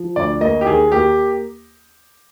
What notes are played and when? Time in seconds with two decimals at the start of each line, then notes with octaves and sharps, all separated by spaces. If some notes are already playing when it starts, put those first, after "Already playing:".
Already playing: F3
0.16 D2 D5
0.41 A#3 D#5
0.61 G4
0.66 D#2 G#4
0.92 A#3 G4